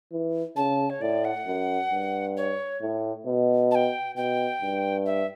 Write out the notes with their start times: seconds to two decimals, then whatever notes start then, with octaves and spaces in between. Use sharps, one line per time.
0.12 E3
0.56 C#3 A5
0.90 C#5
1.01 A2 D5
1.25 F#5
1.47 F#2
1.92 G2
2.37 C#5
2.82 A2
3.26 B2
3.71 A5
3.75 G5
4.16 B2 G5
4.62 G2
5.06 E5